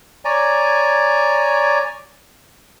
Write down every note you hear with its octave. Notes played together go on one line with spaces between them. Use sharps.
C#5 D5 G#5 A#5